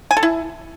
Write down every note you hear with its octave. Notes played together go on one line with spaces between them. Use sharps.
G#5
A4
E4